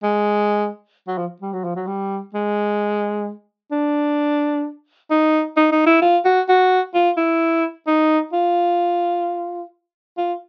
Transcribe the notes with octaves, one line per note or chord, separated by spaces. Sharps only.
G#3
F#3
F3
G3
F#3
F3
F#3
G3
G#3
D4
D#4
D#4
D#4
E4
F4
F#4
F#4
F4
E4
D#4
F4
F4